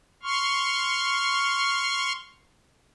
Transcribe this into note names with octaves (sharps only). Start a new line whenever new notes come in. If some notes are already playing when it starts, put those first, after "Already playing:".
C6 C#6 F6